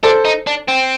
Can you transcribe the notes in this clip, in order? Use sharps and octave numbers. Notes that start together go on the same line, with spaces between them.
D4 A4 C5
D#4
D4
C4